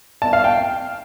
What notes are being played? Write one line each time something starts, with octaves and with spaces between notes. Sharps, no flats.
A5
F5
G5